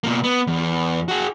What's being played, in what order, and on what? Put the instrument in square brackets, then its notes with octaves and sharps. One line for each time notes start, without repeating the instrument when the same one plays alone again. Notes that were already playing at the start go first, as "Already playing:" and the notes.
[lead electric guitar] B2 A#3
B3
E2
F#4 G#4